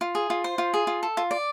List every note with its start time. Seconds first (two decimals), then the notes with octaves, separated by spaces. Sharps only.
0.01 F4
0.15 G#4
0.30 F4
0.44 C5
0.58 F4
0.74 G#4
0.87 F4
1.03 A4
1.17 F4
1.31 D5